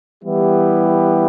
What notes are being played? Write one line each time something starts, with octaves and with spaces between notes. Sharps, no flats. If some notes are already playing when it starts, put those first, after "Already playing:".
E3 G3 B3 E4 G4